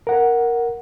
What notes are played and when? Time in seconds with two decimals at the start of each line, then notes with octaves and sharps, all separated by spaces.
0.07 A#4 F#5